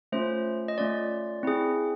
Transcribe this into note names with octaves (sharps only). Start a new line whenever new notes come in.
A3 C#4 F4 C5
D#5
A3 C#4 F4 D5
C4 E4 G#4